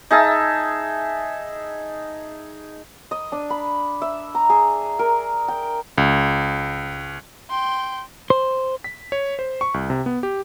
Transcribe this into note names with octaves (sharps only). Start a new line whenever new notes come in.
D#4 G#4 E5 A5
D#5
D4
B5
E5
A#5
G#4
A#4
G5
C#2
G5 C6
C5
B6
C#5
C5
C#6
C2
C3
B3
G4